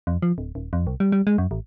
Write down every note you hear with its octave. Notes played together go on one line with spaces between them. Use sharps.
F2
F3
D1
D#1
F2
C2
G3
G3
G#3
F#2
A1